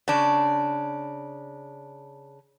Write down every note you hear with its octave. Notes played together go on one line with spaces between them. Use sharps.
C#3 D4